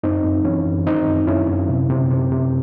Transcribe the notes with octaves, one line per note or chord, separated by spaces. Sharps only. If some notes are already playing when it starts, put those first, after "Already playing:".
F#2 C4 D#4
F#2
E3 C#4
F#2
D#3 C4 D#4
F#2
F#2 C#4 E4
F#2
C3
C3
C3
C3